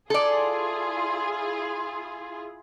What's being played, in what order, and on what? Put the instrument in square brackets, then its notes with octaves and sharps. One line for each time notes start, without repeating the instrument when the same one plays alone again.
[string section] E4 F4 G#4 [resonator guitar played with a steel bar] A4 D5